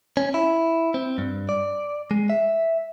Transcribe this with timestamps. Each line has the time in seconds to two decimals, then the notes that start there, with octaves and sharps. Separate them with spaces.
0.17 C#4
0.34 E4
0.94 C4
1.18 G2
1.49 D5
2.11 G#3
2.30 E5